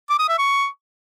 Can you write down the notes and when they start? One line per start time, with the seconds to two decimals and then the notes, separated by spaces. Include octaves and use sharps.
0.10 D6
0.20 D#6
0.29 E5
0.39 C#6